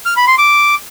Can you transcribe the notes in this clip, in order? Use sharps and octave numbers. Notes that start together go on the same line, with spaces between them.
F6
B5
C6
D6